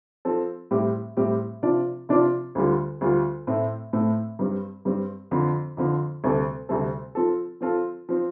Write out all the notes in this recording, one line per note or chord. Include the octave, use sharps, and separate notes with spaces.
F3 C4 A4
A2 G3 C4 G4
A2 G3 C4 G4
C3 F3 D4 F4 D5
C3 F3 D4 F4 D5
D2 D3 G3 F4
D2 D3 G3 F4
A2 A3 C4
A2 A3 C4
G2 G3 C4
G2 G3 C4
F2 D3 F3 C4
F2 D3 F3 C4
D2 C3 G3 C4 A4
D2 C3 G3 C4 A4
F3 C4 F4 A4
F3 C4 F4 A4
F3 C4